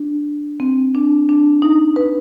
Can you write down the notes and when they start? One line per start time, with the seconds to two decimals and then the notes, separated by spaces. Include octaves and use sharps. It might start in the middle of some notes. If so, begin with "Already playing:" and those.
Already playing: D4
0.60 C4
0.95 D4
1.29 D4
1.62 D#4
1.96 B4